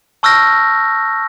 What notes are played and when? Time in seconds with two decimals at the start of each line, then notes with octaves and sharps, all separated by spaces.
0.23 A5 C#6 E6 F6 G6 A#6